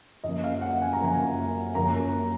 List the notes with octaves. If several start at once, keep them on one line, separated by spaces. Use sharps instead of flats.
F#2 F3 A#3 D#5
F5
F#5
G#5
A#5
F#2 F3 A#3 G#5
F#2 F3 A#3 A#5